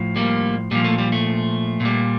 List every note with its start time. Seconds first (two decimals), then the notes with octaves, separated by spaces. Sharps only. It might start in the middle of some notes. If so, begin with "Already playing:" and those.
Already playing: A2 F3
0.16 G3 A#3
0.71 A#2 F3 G3
0.84 A3
0.98 G3
1.12 A3
1.80 A#2 G3